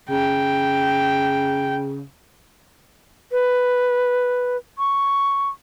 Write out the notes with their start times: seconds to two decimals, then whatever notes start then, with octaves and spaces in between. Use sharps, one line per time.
0.10 C#3 G5
3.32 B4
4.78 C#6